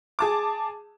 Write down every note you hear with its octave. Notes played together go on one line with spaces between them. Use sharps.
G#4 A5 D6